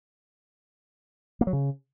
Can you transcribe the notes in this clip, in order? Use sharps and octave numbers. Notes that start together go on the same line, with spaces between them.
A#3
F#3
C#3